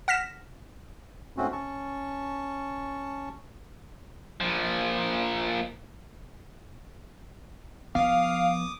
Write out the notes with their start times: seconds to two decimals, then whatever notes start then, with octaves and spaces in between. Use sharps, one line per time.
0.08 F#5 F6 A#6 B6 E7
1.37 G#2 A3 C4 C#4 F#4
1.52 C#4 A5 C#6
4.41 A#2 F3
7.95 F3 B3 F5 D6 D#6